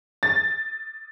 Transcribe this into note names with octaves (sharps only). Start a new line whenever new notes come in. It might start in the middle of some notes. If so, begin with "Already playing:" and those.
A6